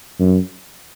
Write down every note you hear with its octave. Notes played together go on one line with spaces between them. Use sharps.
F#2